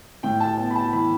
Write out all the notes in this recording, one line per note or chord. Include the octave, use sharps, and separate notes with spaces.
A2 G5
A5
B3 A5
B5
A5
E3 B5